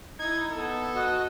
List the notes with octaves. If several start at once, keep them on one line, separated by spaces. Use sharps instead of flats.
D#4 E4 G#6
B3 A4
F#4 D#5